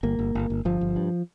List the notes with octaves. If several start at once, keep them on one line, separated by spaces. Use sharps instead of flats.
G1 A#3
G1
G1
G1
G1 F3
G1
G2